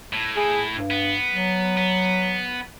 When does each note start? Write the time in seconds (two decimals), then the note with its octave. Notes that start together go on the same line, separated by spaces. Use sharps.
0.13 A2
0.37 A2 E4 G#4
0.74 G2
0.91 B3
1.31 F#3
1.77 B3